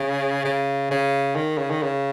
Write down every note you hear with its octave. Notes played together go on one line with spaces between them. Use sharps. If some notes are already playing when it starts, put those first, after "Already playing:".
Already playing: C#3
C#3
C#3
D#3
C#3
D#3
C#3